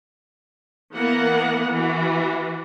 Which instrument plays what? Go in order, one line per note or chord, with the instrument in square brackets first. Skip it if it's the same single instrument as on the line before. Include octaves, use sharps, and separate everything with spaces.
[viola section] E3 A#3 B3 A#4 F#5
E3 F#4